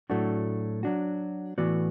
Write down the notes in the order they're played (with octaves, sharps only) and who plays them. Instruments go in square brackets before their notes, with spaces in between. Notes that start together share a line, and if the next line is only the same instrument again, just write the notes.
[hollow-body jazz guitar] A2 F#3 A3 D4 F#4
F#3 D4 F#4
A2 E3 B3 F#4 D5